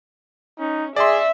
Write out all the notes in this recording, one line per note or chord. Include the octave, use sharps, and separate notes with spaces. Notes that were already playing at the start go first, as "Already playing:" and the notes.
C#4 D#4
G#4 D5 E5 C6